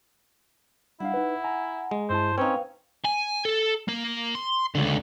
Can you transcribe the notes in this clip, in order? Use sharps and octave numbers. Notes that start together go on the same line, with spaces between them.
G3 D4 E4 F5 F#5
D#4 B4
G#5 A#5
G#3
G2 E4 C5 A5
C4 C#4 D#4 B4 C5 F5 G5
G#5
A4
A#3
C6
C#2 D3